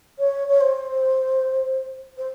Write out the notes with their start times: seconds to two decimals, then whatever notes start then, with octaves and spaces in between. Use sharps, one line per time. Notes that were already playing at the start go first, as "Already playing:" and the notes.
0.19 C#5
0.48 C#5
0.61 C5
2.17 C5